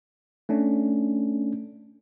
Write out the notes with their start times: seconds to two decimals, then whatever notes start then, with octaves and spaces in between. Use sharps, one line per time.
0.49 A3 C#4 D4